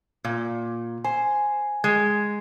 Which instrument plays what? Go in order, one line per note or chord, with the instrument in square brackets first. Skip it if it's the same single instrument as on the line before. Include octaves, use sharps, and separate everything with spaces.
[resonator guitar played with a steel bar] A#2
[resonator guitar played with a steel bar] C5 [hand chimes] G#5
[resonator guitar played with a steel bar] G#3 [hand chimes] G#6